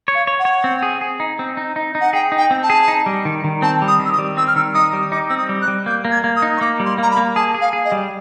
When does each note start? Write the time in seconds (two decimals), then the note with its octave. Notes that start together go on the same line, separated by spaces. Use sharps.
0.08 C#5
0.15 F5
0.27 C#5
0.39 F#5
0.45 C#5
0.64 C4
0.83 G#4
1.01 G#4
1.20 D#4
1.39 C4
1.57 D#4
1.76 D#4
1.95 D#4
2.01 F#5
2.13 G#4 G5
2.32 D#4
2.38 G5
2.51 C4
2.63 A5
2.70 G#4
2.88 D#4
3.06 G3
3.25 D#3
3.44 D#3
3.62 C4 A5
3.82 G3
3.88 D#6
4.00 D#3
4.05 E6
4.12 D#6
4.19 G3
4.37 C4 E6
4.47 F6
4.56 D#3 E6
4.74 D#4 D#6
4.93 G3
5.12 D#4 D6
5.29 C4 E6
5.37 D#6
5.49 G3
5.62 F#6
5.68 G3
5.86 A#3 G6
6.05 A#3
6.11 G#6
6.24 A#3
6.36 D#6
6.42 D#4
6.57 C#6
6.61 A#3 D6
6.80 G3
6.85 C6
6.98 A#3 A#5
7.11 B5
7.17 A#3
7.36 G#4 A5
7.54 G#4
7.61 F5
7.73 G#4
7.85 D#5
7.92 G3